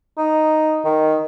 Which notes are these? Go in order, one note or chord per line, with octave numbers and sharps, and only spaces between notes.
D#4
D#3